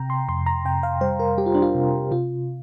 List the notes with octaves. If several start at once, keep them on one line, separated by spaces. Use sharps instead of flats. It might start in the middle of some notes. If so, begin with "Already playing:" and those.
Already playing: C3 G5 A#5
C6
F2 C6
A#5
C3 G5
F5
G3 C5
A#4
G3 G4
F4
D4
F4
C3
C3 F4